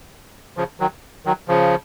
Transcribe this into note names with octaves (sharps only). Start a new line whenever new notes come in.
C#3 F3
D#3 F#3
D#3 F#3
C#3 F3